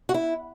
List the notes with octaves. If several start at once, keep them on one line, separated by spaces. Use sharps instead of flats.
F#4
E4